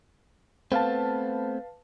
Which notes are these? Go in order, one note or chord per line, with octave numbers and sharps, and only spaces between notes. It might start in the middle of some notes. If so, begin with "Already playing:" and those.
A3 B3 C4 B4 F5 A5